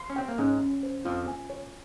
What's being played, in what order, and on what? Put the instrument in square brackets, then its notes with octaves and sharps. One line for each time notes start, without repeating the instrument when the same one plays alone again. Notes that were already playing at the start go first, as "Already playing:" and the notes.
Already playing: [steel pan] C6
[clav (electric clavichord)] C#4
[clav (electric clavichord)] C4 [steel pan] G5
[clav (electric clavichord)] A#3
[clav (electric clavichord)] G#2 G#3 [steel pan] C#4
[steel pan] C#4
C5
[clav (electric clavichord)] F2 F3 [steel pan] F4
[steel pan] G#5
C#5